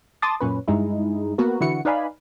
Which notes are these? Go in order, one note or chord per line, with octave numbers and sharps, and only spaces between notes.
A5 C6 D6 D#6 A6
F#2 A#2 C#4 B4
G2 G#3 D#4 E4
A#3 B3 F#4 A#4
D3 E3 E4 F#4 C#7
D#4 B4 D5 F5 G#5 B5